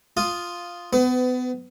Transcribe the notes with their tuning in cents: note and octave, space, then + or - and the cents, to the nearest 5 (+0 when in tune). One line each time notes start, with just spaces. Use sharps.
F4 +0 D#6 -5
B3 +30 B4 +40